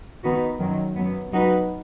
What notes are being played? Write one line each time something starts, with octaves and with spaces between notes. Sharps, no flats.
D#3 B3 D#4 F#4 B4
F#2 D#3 F#3
F#2 F#3 B3
F#3 D#4 F#4 B4